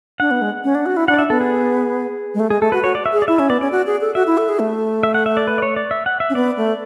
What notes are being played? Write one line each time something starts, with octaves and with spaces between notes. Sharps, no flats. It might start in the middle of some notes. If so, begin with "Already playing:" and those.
D4 F#5
B3
G#3
C#4
D4
F#4
E4
D4 F#5
D5
E5
B3 A4
G#4
G#3
A3
G#3 G#4
A3 A4
F#4 B4
F#4 C#5
D5
E5
G#4
D5
E4 E5
C#4 E5
B3 D5
C#4 D5
F#4
G#4
A4
F#4 E5
E4
A4
G#4
A3
E5
F#5
E5
D5
B4
D5
C#5
D5
E5
F#5
E5
C#4
B3 D5
A3